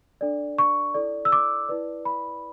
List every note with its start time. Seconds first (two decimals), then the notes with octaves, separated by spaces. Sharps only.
0.21 D4 A4 D5
0.58 C#6
0.94 E4 A4 D5
1.25 E6
1.32 D6
1.69 E4 B4 D5
2.05 B5